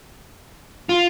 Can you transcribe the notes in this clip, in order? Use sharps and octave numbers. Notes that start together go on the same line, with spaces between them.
F4